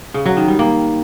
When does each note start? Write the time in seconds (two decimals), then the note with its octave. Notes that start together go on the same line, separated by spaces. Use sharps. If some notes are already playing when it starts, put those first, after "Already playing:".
0.14 C#3
0.26 F#3
0.37 D#3
0.48 G3
0.59 A#3